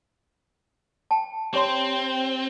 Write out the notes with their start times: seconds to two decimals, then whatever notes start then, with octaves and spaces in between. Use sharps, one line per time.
1.11 G5 A5
1.54 C4 G4 C#5 C6